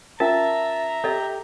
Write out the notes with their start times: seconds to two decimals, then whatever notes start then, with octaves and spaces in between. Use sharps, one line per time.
0.20 C#4 F4 A#4 E5 A5 A#5
1.04 G4 A4 D#5